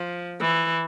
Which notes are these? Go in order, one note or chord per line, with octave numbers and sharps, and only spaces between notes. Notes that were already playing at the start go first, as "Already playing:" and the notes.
Already playing: F3
E3